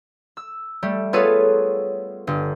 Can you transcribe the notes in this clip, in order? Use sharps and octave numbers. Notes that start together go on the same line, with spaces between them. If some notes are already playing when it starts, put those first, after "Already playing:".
E6
G3 A3
B3 F4 G#4 A4 B4 C#5
G1